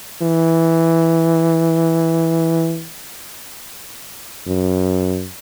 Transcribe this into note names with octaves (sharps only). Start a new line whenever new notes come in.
E3
F#2